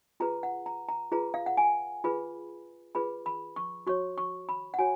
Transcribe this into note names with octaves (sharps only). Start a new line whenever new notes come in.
F4 G#4 B4 A#5
F#5
A#5
A#5
F4 G#4 B4 A#5
F5
F#5
G#5
F4 G#4 B4 B5
F4 G#4 B4 B5
B5
C#6
F#4 C#5 C#6
C#6
B5
F#5
F#4 C#5 G#5